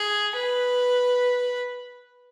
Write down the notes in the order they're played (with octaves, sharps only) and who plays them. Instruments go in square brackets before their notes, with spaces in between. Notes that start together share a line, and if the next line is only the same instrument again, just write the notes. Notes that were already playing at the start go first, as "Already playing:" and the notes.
Already playing: [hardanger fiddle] G#4
B4